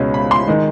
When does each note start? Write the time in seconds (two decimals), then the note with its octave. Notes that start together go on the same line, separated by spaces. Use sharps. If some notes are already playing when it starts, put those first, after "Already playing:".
Already playing: C#2 B2 G#3 C#4
0.14 B5
0.31 C6
0.48 D#3 G#3